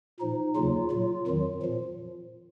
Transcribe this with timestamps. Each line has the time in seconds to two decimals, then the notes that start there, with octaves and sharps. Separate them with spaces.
0.20 A#2 F3 D#4
0.55 D#2 C#3 F#3 F4
0.91 A#2 F#3 F4
1.27 F2 D#3 F#3
1.62 A#2 F3